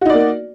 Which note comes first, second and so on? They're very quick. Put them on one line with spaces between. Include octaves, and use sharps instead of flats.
F#4 D#4 D5 A#3